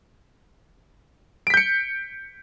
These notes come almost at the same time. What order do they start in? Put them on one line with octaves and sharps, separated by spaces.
D7 B6 G6 C#7